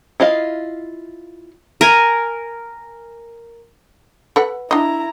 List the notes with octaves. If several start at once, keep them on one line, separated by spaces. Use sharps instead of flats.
E4 F4 D#5 F5
A#4 G#5
A4 B4 F#5
D4 E4 D#5 A#5